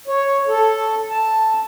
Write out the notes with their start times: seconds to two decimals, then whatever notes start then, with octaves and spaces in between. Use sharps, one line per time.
0.08 C#5
0.47 A4
1.10 A5